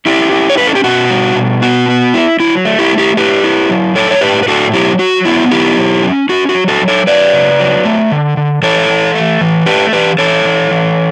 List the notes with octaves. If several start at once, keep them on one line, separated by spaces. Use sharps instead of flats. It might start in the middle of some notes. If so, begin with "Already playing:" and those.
C#4 E4 G4
E4
C#5
C#4 B4
A4
G4
B2 F#4
G3
B2
B3 F#4
B3
E4
F#3 E4
A3
E4 G4
A3
E4 G4
E4 G4 B4
E4
F#3
A2 A4 C#5
C#5
A2 G4 B4
B4
A2 F#4 A4
F#3 E4 G4
F#3 F#4
B3 E4
D3 E4 G4
F#3
C#4
C#4 F#4
F#4
F#3
F#4 A4
F#3
A4 C#5
F#3 B4 D5
C#3
F#3
A3
D3
D3
E3 A4 C#5
E3
A3
E3
A3 G4 B4
E3 G4 B4
E3 A4 C#5
E3
E3